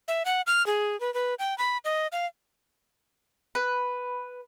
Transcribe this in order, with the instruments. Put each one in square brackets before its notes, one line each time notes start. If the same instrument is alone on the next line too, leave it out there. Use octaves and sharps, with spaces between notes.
[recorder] E5
F#5
F6
G#4
B4
B4
G5
B5
D#5
F5
[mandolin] B4